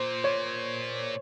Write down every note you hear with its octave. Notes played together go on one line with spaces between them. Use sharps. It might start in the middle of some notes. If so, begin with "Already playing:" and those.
Already playing: A#2 C5
C#5